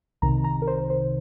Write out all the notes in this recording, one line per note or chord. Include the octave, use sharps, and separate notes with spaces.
C2 C3 D#3 A#5
A#5
A#4
C5
C5